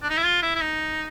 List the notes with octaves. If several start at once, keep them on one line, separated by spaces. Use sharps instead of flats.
D4
D#4
E4
F4
E4
E4
D#4